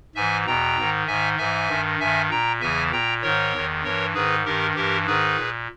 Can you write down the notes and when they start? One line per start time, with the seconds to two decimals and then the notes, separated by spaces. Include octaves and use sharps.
0.15 G#2 E3 E5 G#5
0.47 E2 B2 G5 A#5
0.77 G#2 D#3
1.07 G#2 D#3 E5 G#5
1.38 G#2 E3 E5 G#5
1.69 G2 D#3
2.00 G2 D#3 E5 G#5
2.30 A#2 G5 A#5
2.60 E2 C#3 E3 E5 G#5
2.92 A#2 G5 A#5
3.22 G#2 D#3 A#4 C#5
3.53 E2 D#3
3.83 G2 E3 A#4 C#5
4.14 G#2 D#3 G#4 B4
4.45 G2 D#3 G4 A#4
4.75 G2 E3 G4 A#4
5.06 G#2 D#3 G#4 B4
5.37 A#2